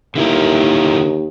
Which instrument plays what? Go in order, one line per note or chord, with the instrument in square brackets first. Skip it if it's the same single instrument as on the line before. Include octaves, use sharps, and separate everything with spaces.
[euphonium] D#2 [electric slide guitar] D3 E4 A#4